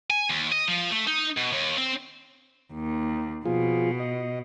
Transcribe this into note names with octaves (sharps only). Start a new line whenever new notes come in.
G#5
D#2
D#5
F3
A3
D#4
B2
D#2
C4
D#2
B2 F3 F4 G#4
D#5